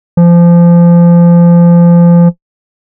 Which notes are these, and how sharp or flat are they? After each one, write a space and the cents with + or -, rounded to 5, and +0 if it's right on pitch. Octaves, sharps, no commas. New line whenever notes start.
F3 -25